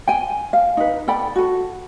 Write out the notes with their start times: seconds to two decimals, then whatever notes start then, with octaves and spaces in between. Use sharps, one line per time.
0.07 G5 G#5
0.53 F5
0.77 D#4 B4
1.08 A4 D5 G5 B5
1.35 F#4 A4